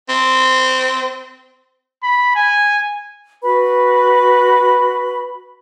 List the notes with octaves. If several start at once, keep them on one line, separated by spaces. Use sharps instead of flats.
C4
B5
G#5
F#4 B4 B5